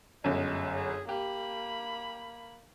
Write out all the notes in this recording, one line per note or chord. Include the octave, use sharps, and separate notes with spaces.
G1 F#2 G#3
G#4
A#3 G4 B5